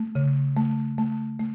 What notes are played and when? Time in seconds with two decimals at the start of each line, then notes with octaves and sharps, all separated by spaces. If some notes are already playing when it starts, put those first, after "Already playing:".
Already playing: A3
0.15 C#3
0.57 A3
0.98 A3
1.40 A3